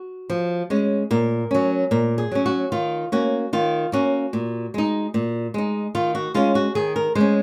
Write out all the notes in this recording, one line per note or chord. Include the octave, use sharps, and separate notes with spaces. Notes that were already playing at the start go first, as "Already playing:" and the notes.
Already playing: F#4
F3
G#3 C#4
A#2 A#4
F#3 C#4
A#2 A#4
G#4
F#3 C#4
F#4
D#3 F4
A#3 C#4 F#4
D#3 F4
A#3 C#4 F#4
A#2
G#3 D#4
A#2
G#3 D#4
D#3 F4
F#4
G#3 C#4 F4
F#4
D#3 G#4
A#4
G#3 C5
C#4